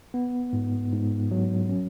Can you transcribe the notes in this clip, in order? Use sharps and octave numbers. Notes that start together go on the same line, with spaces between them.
B3
G#2
G#2
F#3
C#4